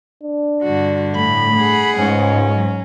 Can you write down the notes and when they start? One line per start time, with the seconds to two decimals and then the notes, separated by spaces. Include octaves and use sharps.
0.23 D4
0.63 G2 D3 F#4
1.15 A2 B5
1.56 G#4 F#5
1.96 C#2 G#2 C#4
2.54 F#3